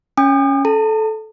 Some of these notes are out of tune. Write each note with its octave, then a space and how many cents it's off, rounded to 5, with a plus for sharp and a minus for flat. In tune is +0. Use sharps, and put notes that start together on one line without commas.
C#4 +0 G#5 -45 D#6 -40
A4 -15 A5 +45